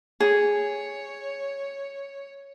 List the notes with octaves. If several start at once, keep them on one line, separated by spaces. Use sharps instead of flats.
G#4 C#5